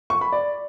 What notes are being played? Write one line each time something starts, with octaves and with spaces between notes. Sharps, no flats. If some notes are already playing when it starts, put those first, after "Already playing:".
C#6
B5
D5